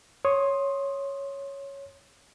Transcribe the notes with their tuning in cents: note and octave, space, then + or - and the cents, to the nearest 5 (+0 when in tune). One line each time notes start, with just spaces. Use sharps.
C#5 +0 C6 +20 D#6 +0